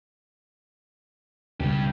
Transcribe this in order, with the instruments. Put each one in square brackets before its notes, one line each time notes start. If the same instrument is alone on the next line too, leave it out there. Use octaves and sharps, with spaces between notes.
[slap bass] C#2 B2 [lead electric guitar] G2 G4